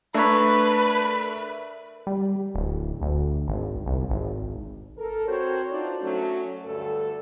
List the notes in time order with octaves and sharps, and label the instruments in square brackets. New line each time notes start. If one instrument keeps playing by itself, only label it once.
[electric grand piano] A3 D4 [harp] A#4 B5 [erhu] B4 [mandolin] C#5 E5
[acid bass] G3
D1
D2
G#1
C2
G#1
[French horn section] A4 A#4
C4 F#4 A4 A#4 C5 C#5
D4 D#4 F4 F#4 C5 D5
F#3 A3 C#4
D2 G2 A4